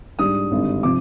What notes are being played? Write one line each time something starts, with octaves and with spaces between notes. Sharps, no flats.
G#2 G3 D4 D#6
G#1 G2 D3 G3
C3 F3 C4 D6